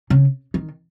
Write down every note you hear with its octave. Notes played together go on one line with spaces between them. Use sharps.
C#3
D#3